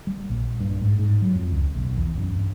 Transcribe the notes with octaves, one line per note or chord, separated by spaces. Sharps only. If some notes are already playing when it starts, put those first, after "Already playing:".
G3
A#1
G2
G#2
G#2
F#3
F2
C#2
B1
E2
F#2
G2